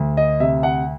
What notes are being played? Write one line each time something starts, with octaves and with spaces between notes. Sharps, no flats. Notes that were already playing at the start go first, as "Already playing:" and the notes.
Already playing: D2
D#5
C3 E5
F#5